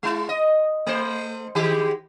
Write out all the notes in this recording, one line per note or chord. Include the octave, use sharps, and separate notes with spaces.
G#3 E4
D#5
A3 C5
D#3 G#3 G4